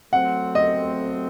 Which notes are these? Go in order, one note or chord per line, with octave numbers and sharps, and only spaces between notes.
F#3 A3 C4 F#5
D#5